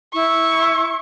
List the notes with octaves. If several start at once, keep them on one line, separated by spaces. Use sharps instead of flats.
E4 C#6